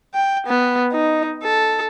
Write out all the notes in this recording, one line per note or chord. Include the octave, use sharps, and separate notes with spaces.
G5
B3
D#4
A4